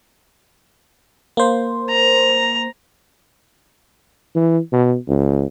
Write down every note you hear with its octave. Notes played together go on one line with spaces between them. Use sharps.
A#3 C5
A#5
E3
B2
C#2